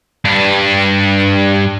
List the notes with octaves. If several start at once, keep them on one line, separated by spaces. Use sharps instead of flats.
G2 D4